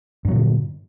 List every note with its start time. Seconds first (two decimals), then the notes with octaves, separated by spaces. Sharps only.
0.25 G2
0.28 F#3
0.31 A#2
0.35 D3